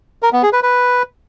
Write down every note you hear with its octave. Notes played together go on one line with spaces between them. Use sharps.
A#4
B3
G#4
B4
B4